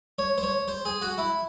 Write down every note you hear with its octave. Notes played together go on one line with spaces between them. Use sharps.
C#5
C5
C#5
C5
G#4
F#4
E4